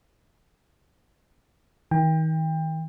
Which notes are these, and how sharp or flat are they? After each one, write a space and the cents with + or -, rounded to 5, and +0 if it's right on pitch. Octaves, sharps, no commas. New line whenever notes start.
D#3 +35 G5 +25